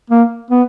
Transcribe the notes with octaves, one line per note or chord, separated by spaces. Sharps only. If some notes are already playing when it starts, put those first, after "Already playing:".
A#3
B3